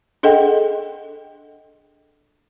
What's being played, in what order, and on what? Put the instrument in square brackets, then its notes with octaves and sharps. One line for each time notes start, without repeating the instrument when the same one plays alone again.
[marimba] D4 G#4 A4 D#5 F#5 G5